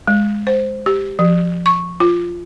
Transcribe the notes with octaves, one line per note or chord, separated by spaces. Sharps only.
G#3
C5
G4
F3
C#6
F4